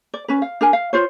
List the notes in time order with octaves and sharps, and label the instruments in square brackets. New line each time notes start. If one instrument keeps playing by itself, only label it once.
[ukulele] D5
C#4 B4
F5
D4 A#4 G#5
F5
F4 C5 C#5